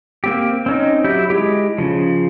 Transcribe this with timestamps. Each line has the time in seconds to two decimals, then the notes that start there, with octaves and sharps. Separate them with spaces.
0.24 A#3 C4 G4
0.66 C4 C#4 D#4
1.04 F#3 E4 G4 G6
1.30 G#3 E4 G4
1.78 C#3 F3